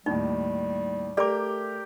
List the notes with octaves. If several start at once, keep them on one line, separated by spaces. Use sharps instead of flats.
D#2 A2 G3 D#4
A3 G4 A#4 D5 D6